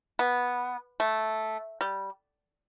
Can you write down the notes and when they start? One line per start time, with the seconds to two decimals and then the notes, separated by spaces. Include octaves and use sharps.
0.19 B3
1.00 A3
1.81 G3